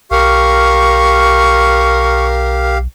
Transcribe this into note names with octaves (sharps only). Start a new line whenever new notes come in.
B1 G4 A#4 F5 C#6